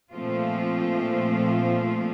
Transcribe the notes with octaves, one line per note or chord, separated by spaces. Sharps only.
A#2 F3 A3 C4 F4